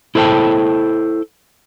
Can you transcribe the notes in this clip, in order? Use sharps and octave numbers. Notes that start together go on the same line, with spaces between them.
E4 A4 C5 C#5 G5 A5